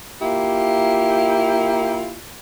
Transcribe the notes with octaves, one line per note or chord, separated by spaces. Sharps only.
A#3 E4 F4 G4